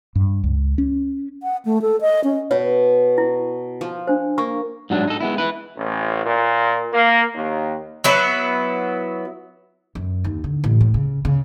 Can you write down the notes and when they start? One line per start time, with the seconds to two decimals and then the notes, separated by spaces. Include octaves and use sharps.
0.16 G2
0.44 C#2
0.78 C#4
1.43 F#5
1.65 A3
1.82 A4
2.01 D#5
2.24 C#4
2.51 B2 C#5
3.18 E4
3.81 F3
4.07 D4 C5
4.38 A#3 C#6
4.90 G#2 F#3 D4
5.08 D#4 A4
5.21 G#3 B3 E4
5.38 E4 B4
5.76 A1
6.26 A#2
6.93 A#3
7.35 D#2
8.04 F#3 B3 E4
9.95 F#2
10.24 D#2
10.44 D3
10.64 A1
10.81 A2
10.94 C#3
11.25 C#3